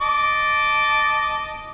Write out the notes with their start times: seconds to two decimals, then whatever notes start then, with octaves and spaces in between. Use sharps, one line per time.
0.01 D#5 A5 D6